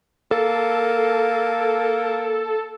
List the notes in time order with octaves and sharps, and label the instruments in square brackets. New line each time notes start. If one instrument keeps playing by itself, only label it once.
[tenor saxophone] A#3 [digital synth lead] A4